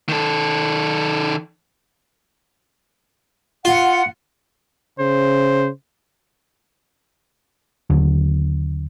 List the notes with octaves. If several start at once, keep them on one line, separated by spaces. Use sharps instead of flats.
D#3 A4
F4 F#5
C#3 C5
D#2 D3 F#3 D4